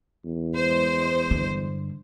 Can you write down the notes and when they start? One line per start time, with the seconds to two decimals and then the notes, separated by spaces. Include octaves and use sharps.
0.25 E2
0.56 G#3 C5
1.31 G2 D3